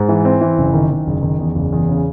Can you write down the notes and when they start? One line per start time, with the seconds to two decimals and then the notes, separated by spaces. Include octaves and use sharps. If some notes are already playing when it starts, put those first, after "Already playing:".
Already playing: G#2
0.09 E3
0.25 C4
0.41 E3
0.58 F#1
0.74 D#3
0.91 D#3
1.07 F#1
1.23 D#3
1.39 E2
1.55 F#1
1.72 E2
1.89 C#3